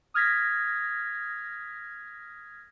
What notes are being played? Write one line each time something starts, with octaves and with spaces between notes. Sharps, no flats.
D#6 F6 G#6 A#6 B6